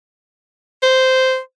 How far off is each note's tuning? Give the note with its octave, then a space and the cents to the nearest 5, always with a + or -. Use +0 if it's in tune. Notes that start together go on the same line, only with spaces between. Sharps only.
C5 -10